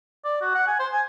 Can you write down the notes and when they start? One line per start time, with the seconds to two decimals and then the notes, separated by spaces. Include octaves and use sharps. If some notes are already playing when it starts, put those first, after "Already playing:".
0.24 D5
0.41 F#4
0.55 F#5
0.67 G#5
0.79 C5
0.92 G#5